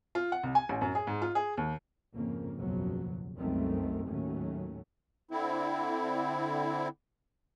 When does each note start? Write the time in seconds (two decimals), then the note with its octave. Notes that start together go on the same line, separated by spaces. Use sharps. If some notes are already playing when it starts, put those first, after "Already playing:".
0.15 F4
0.32 F#5
0.43 C2
0.55 G#5
0.69 A1
0.82 F#2
0.95 G#4
1.07 G#2
1.22 F4
1.35 G#4
1.57 D#2
2.15 F2 G#2 C#3 A#3
2.58 F#1 B1 E2 C#3 F3 F#3
3.37 C2 F#2 D#3 G#3 A3 C4
4.06 D#2 A2 D#3 F#3 A3 C#4
5.31 D3 C4 E4